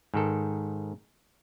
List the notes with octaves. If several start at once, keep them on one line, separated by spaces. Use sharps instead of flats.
G#2 D#3 A4